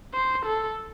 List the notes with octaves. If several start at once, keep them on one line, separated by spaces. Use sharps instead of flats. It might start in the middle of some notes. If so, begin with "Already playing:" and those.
C5
A4